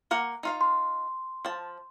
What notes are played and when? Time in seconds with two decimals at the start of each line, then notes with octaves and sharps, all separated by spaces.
0.11 A#3 A#4 F#5
0.43 D#4 F4 F5
0.61 C6
1.45 F3 A5